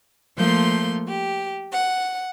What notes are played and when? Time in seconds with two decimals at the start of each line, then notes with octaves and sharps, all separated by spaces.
0.36 F3 A3 A#3 C6 G6
1.08 G4
1.72 F#5